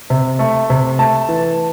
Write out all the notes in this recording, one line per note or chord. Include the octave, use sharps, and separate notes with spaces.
C3
A3
C3
A3 A5
E3